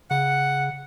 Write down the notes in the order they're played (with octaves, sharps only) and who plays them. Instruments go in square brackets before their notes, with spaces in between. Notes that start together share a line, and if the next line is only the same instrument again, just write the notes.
[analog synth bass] C#3 [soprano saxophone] F#5